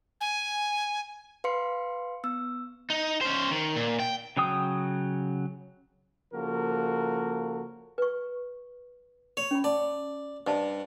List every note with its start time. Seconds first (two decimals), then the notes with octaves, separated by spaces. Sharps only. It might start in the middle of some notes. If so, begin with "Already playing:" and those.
0.21 G#5
1.44 B4 F5 C6 C#7
2.24 B3 E6
2.90 D#4
3.21 C#4 C5
3.51 D#3
3.76 A#2
4.00 G5
4.37 C#3 F#3 G5 D#6
6.33 C#3 F3 A#3 F#4 A4 A#4
7.98 B4 C#6
9.37 C#5
9.51 C#4 B5
9.64 D5 A5
10.47 G2 C5 D#5 A5